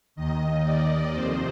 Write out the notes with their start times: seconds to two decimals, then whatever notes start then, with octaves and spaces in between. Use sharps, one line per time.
0.16 D#2 D#3 D#5
0.64 D5
1.12 F2 C3 D#3 C5